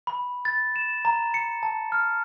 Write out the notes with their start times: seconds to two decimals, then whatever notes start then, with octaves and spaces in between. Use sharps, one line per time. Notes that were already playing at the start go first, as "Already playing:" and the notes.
0.07 B5
0.45 A6
0.76 E7
1.05 A#5
1.34 C#7
1.63 A5
1.92 F6